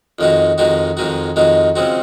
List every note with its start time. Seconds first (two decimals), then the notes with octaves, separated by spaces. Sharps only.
0.19 F2 D#3 G#3 D#4 F#4
0.58 F2 D#3 G#3 D#4 F#4
0.97 F2 D#3 G#3 D#4 F#4
1.36 F2 D#3 G#3 D#4 F#4
1.75 C#3 F3 G#3 C4 F#4